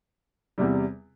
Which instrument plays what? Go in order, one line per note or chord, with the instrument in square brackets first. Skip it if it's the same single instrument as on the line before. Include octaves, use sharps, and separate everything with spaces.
[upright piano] E2 C3 G3